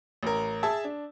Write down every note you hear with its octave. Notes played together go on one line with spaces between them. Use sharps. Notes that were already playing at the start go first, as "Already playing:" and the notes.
A1 A#4
G#4 E5 A5
D4